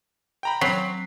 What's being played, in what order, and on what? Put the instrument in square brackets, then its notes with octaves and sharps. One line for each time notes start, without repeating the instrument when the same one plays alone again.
[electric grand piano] G5 A#5 B5
[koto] F#3 [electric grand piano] C4 B6 C7